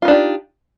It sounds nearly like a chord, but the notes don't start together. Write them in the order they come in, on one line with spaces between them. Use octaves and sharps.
F4 D#4 D4 G4